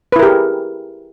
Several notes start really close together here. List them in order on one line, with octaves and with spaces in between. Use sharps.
B4 E4 A#4 G4 G#4